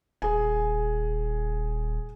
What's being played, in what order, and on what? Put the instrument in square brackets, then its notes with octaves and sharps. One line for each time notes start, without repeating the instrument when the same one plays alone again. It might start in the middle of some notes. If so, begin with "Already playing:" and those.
[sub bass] D#1 [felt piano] G#4 G#5